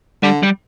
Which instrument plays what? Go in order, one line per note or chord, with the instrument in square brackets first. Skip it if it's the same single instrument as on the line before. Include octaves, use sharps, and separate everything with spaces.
[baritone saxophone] D3 [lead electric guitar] G3
[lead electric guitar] G3